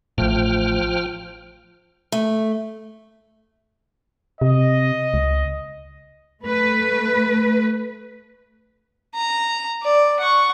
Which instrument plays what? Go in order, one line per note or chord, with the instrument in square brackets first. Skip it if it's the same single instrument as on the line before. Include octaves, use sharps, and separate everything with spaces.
[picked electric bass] A1 A2 [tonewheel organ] F3 G5 F6
[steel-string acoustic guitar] A3
[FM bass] C3 [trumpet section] D#5
[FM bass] C#2
[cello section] A3 B4
[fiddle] A#5
D5
F#5 C#6